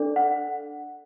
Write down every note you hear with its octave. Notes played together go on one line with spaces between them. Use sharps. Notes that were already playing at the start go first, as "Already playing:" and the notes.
Already playing: D4 A4 D5
F#5